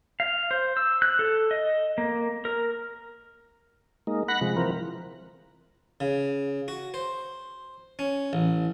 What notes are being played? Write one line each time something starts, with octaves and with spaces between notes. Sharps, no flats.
F5
C5
E6
F#6
A4
D#5
A#3
A#4
G#3 A#3 D#4
F#5 B5 F#6 A#6
C3 F3 G#3
E3 F3 C4 A#4
C#3
F#4
C5
C#4
A1